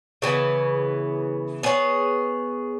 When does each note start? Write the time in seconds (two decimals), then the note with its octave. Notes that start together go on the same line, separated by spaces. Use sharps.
0.22 C#3 E3 B3
1.63 B3 G#4 C#5